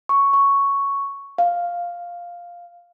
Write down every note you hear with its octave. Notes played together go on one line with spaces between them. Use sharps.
C#6
C#6
F5